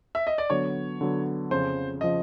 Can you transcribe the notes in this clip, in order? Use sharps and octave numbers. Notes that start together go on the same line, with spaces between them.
E5
D#5
D5
D3 F#3 B3 C#5
D3 F#3 B3
F2 C#3 F3 C5
C#3 F3 D#5